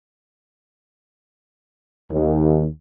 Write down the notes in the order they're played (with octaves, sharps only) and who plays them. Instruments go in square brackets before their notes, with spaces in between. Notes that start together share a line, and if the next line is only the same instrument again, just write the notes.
[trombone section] D#2